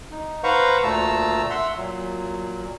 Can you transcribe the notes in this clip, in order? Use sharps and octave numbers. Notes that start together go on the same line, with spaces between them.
D#4
B4 C5 F5 F#5 A#5 C#6
D2 A#2 A3 A5 A#5 E6
E5 F#5 C6 E6
A#2 F#3